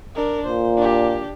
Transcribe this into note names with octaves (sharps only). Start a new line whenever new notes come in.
D4 A#4
A#2 C5
D4 G4